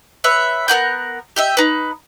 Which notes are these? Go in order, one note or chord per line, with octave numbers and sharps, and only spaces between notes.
B4 C#5 E5
B3 A#4 F#5 G6
G4 D#5 E5
D#4 B4